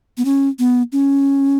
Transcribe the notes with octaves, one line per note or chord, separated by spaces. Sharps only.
B3
C#4
B3
C#4